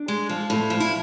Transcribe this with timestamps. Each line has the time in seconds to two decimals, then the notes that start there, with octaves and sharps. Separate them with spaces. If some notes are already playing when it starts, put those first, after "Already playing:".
Already playing: D4
0.08 G#3
0.29 F3
0.50 A2
0.70 F3
0.80 E4